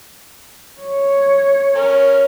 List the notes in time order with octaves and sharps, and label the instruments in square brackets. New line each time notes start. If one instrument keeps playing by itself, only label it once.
[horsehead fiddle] C#5
[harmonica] C#4 A#4